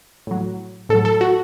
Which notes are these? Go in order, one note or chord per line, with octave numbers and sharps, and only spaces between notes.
A2 F#3
A2 F#3 A4
A4
F#4